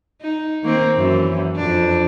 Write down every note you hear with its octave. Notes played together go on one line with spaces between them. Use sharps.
D#4
D#3 A#3 C4
F#2 E3
F2 D4